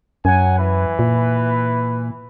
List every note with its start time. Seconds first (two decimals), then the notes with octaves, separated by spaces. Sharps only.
0.25 F#2 F#3 F#5 G#5
0.58 E3 B4
0.99 A#2